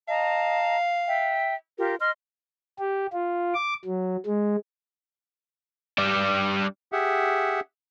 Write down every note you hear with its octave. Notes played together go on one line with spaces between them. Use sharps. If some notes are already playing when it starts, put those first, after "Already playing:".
D#5 F5 A5 A#5
E5 G5
F4 G4 A#4
D#5 C6 F6
G4
F4
D6
F#3
G#3
G3 D4
G4 G#4 E5 F#5